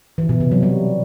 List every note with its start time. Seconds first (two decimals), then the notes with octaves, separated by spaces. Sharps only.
0.18 E3
0.29 B2
0.40 C3
0.52 F#3
0.63 G3